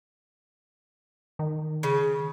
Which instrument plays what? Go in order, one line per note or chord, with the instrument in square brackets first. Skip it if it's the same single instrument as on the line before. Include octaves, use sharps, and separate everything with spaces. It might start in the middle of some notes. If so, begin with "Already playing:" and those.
[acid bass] D#3
[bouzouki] C#3